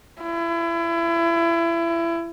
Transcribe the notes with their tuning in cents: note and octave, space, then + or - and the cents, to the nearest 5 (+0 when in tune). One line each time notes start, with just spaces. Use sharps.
E4 +30